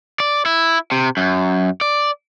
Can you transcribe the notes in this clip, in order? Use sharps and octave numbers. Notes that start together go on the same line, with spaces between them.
D5
E4
C3
F#2
D5